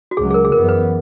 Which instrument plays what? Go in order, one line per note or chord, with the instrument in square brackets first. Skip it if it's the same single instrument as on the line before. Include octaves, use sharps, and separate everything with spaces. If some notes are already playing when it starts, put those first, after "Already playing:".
[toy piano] F#4
[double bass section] C#2 C#3 F#3 [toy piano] G#4
[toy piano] G#4
A#4
G#4
[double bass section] F#2 E3 B3 [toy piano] A#4
[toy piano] B4